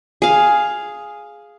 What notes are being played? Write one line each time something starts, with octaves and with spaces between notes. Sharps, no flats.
G#4 F5